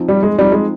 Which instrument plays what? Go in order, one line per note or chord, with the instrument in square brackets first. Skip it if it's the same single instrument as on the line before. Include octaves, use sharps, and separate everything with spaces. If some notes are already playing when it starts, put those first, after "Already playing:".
Already playing: [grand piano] F3 C4 D#4
[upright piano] G3
G#3
[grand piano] F3 C4 D#4 [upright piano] G3
[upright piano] G#3